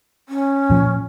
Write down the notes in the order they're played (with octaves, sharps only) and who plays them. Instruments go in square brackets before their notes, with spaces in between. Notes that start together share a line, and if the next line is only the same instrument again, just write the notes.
[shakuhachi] C#4
[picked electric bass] A#2 F3